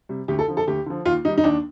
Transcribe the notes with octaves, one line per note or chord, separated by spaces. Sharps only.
C3 G3
D2 G4
A4
D3 F3
A4
D2 G4
D3 F3
D#2 F4
D#3 G3 D#4
D#4
D#2 D4